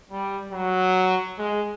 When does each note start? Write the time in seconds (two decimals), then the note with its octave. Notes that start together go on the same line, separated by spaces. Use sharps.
0.11 G3
0.52 F#3
1.38 G#3